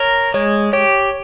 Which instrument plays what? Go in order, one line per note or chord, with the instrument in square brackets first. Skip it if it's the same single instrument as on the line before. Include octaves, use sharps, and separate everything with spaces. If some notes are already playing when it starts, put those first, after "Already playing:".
Already playing: [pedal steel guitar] A#4 [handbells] C#5
[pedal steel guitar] G#3 [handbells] C#5
[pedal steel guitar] G4 [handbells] C#5